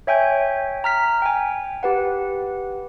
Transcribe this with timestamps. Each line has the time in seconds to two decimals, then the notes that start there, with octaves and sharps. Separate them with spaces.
0.07 C#5 E5 G5 G#5 G6
0.84 A#5 F6 B6
1.22 G5 G#5
1.83 G4 B4 F#5